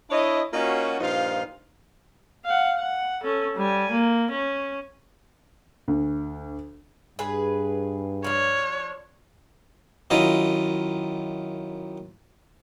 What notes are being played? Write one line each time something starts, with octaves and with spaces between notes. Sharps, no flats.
D4 E4 C#5 D#5
A#3 C#4 D#4 F4 F#4
G2 A#2 F3 D#4 F4 F5
F5 F#5
F#5
C#4 A4
G3 G#5
A#3
C#4
D2
G2 G#4 B4
F3 D4 C#5
F#2 D#3 E4 F4 D#5